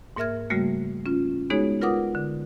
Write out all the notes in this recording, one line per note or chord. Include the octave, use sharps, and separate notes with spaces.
G#2 A#3 A#4 E5 F6 G#6
C#3 G3 A3 A#3 F#4
C#4 F4
G#3 B3 D#4 F#4 G#4 C#5
F4 A#4 B4 F#5 D6 D#6
D3